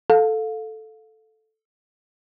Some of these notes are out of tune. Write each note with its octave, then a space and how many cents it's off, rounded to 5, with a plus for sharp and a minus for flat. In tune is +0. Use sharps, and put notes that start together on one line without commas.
A4 +0 F5 +25